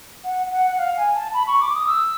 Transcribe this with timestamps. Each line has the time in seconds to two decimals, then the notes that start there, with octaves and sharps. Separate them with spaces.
0.24 F#5
0.51 F#5
0.71 F#5
0.79 F5
0.97 G#5
1.15 A5
1.34 B5
1.47 C#6
1.60 D6
1.74 D#6
1.87 E6